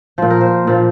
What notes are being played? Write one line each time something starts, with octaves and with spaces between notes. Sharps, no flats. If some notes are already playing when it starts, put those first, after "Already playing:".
A#2 F3 C5
A#4
C5
A#2 F3